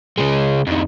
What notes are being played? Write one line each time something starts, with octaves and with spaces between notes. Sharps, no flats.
C#3 G#3
F2 D#3